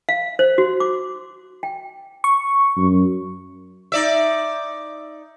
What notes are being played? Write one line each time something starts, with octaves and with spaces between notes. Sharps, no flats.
F5
C5
F#4
D6
G5
C#6
F#2
D#4 D5 E5